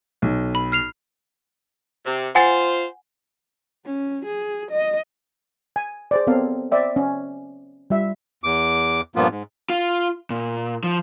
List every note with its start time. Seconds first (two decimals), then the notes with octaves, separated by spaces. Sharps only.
0.22 B1
0.55 B5
0.72 F6 C7 F7
2.06 C3
2.35 F4 C5 F#5 G#5 A6
3.85 C#4
4.25 G#4
4.71 D#5
5.76 G#5
6.11 G#4 C5 D5
6.27 B3 C4 A4 A#4 C#5 F5
6.71 C5 D5 E5 G5
6.96 C#4
7.90 G3 F4 E5
8.44 E2 D6
9.16 G2 A#2 F3 A#3 B3 F4
9.31 G#2
9.70 F4
10.30 A#2
10.84 F3